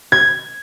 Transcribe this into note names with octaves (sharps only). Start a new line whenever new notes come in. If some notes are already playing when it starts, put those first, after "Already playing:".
G#6